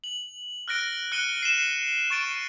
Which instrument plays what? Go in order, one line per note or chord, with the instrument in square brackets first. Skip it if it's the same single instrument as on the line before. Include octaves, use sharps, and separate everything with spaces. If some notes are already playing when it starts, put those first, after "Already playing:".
[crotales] F#7
F6 F#6 A#6 D7
F#6 C#7 D#7 G7
C7 E7
C#6 A6 D7 E7